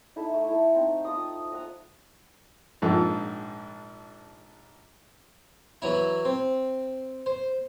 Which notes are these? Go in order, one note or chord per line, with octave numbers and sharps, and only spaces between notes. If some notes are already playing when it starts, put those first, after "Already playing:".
D#4 E4 A4
A3
E4 A4
C4 D#4
F4 D#5 D#6
D#5 F#5 A#5
A#1 G#2 F3 A4
E3 F#3 E4
C4
C5